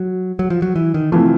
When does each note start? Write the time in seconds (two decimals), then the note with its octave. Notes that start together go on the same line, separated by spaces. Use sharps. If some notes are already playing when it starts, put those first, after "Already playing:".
Already playing: F#3
0.39 F#3
0.50 F3
0.62 F#3
0.76 E3
0.94 D#3
1.12 C3 E3 F3 A3